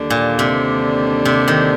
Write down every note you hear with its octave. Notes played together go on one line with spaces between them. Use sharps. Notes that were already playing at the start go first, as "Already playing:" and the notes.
Already playing: D#2 D3 G3 D4
A#2
C3
C3
D#3